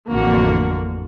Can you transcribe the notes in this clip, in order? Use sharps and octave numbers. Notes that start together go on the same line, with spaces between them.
A1 F2 D3 A#3 F#4